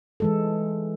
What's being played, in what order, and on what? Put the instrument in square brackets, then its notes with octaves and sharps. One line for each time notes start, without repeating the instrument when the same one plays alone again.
[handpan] E3 G#3 A4